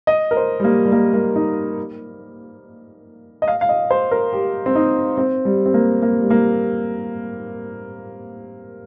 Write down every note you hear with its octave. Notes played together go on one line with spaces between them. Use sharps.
D#5
A#4
C5
G3
A#3
G3
A#3
A#3
D#4
D#5
F5
F5
D#5
C5
A#4
G4
C4
D#4
C4
G3
C4
A#3
A#3
G3
A#3